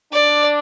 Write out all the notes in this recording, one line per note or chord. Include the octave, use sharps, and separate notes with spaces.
D4 D5